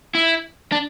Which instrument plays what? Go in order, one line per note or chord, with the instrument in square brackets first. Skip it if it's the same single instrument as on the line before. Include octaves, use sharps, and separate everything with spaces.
[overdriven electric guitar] E4
D4